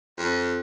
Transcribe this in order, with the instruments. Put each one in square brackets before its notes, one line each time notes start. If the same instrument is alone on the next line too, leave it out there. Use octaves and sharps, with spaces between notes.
[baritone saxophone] F2